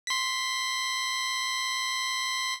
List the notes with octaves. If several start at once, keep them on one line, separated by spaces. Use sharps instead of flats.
C6 B6